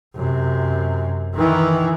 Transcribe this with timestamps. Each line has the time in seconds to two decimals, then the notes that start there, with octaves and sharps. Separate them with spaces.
0.15 F#2 C3
1.34 D#3 E3